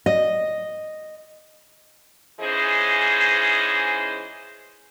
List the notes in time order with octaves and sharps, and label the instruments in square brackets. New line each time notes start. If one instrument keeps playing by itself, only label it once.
[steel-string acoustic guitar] D#5
[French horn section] G#2 E3 C#4 G#4 C5 D#5